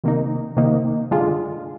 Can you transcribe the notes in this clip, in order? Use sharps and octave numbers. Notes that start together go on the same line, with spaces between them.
C3 D#3 A#3 D#4
C3 D#3 A#3 D#4
G2 D3 G#3 D4 F4